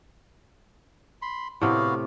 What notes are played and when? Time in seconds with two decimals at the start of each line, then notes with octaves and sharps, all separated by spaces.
1.22 B5 C6
1.61 A2 C3 B3 F#4 F5